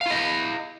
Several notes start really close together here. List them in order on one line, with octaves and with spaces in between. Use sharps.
F5 E4 D#5